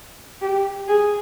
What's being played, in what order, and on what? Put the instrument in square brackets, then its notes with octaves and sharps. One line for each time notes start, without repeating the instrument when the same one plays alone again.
[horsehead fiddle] G4
G#4